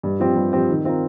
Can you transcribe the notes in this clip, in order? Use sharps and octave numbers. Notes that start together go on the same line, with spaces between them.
G2
F3 C4 G4
G2
F3 C4 G4
D#3
C4 F4 A#4